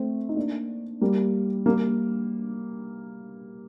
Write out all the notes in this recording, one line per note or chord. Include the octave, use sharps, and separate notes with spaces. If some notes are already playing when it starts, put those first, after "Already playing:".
Already playing: A3 C4
D#4
A#3 D4
G3 A#3
G3 A#3